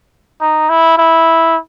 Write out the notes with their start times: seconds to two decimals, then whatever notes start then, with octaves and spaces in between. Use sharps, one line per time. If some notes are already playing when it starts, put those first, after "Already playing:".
0.41 D#4
0.70 E4
0.98 E4